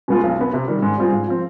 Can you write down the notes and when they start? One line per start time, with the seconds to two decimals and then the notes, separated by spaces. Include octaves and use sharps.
0.08 B2 G#3 B3 F4
0.23 B1
0.38 B2 B3
0.53 C3
0.68 D#3 G3
0.82 G#2
0.98 G3 C4 F4 G#4
1.13 G#2
1.28 F3 C4